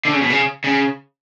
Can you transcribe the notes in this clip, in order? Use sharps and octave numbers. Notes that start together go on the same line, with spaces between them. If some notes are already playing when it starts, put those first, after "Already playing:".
D3
C#3
B2
C#3
C#3